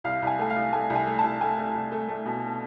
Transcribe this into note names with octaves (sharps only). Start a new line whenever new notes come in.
C2 F5
C2 G#5
A3 G#5
F5
C2
A3 G#5
C2
G#5
A3
C2 A5
A3 G#5
A3
C2
A3
A3
B2